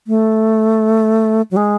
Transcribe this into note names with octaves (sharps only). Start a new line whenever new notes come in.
A3
F#3
G#3